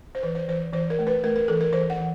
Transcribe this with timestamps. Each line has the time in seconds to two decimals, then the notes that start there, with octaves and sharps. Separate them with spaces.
0.15 C5
0.23 E3 B4
0.35 C5
0.48 E3 C5
0.73 E3 C5
0.90 A#4
0.99 A3
1.07 B4
1.24 A3 A#4
1.36 A#4
1.48 E3 A4
1.61 A#4
1.73 E3 C5
1.90 F#5
1.98 E3